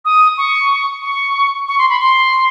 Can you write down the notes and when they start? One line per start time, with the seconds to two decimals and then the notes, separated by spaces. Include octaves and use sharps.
0.05 D#6
0.37 C#6
1.02 C#6
1.68 C#6
1.78 C6
1.90 B5
2.00 C6